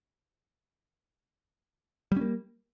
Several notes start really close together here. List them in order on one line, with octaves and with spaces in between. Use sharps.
G3 C#4 A#3